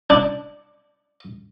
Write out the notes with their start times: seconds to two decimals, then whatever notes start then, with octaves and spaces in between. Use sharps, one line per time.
0.10 D4